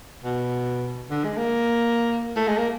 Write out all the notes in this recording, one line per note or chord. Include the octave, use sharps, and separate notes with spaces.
B2
D3
G#3
A#3
A3
G#3
A#3